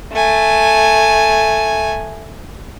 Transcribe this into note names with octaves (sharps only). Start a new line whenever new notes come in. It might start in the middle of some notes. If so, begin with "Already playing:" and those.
A3 G#5